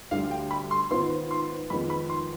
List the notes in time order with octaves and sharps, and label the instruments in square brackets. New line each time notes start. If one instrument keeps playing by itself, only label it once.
[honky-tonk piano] D2 D3 G3 [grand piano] F5
[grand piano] G5
B5
C6
[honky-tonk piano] G#2 D#3 B3 F4 C5 [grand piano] C6
[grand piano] C6
[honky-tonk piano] F2 D#3 G#3 B3 [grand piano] B5
[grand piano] B5
C6